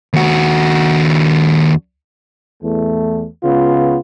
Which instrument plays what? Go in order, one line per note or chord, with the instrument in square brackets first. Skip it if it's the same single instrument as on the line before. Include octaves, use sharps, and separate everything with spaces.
[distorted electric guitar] D#2 F#4
[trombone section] E2 A3
C#2 C#3 B3 F4